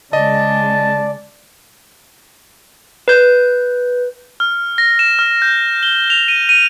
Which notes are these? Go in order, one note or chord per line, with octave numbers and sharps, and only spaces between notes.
C#3 G#3 D5 D#5 A5
B4 G6
F6
A#6
E7
F6
G6
G7
F7
D#7
D#7